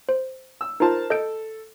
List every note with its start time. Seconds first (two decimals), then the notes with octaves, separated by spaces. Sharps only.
0.09 C5
0.61 E6
0.80 D#4 F4 A#4 C5 A5
1.10 A4 D#5 G6 D7